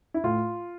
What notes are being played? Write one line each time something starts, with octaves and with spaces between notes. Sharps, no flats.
E4
A2 F4